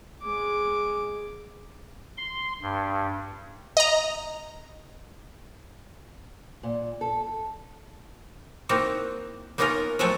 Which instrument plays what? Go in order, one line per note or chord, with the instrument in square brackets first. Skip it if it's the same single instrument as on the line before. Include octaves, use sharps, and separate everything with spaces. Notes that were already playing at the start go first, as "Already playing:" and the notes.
[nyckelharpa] G#3 D6
[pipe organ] C6
G2
[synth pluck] D#5 A#5
[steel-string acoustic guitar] A#2
A4
[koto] A#3 C4 D#4 E4 F#4
A#3 B3 C#4 D#4 F4 A#4
F3 F#3 A3 G#4 A4 C#5